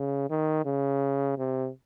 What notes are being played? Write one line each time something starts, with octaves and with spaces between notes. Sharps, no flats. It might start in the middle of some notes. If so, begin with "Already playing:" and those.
Already playing: C#3
D#3
C#3
C3